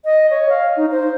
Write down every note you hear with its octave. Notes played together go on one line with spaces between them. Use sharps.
D#5
C#5
F5
D#4
C5